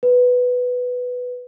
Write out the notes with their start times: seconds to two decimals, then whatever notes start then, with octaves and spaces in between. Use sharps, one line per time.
0.03 B4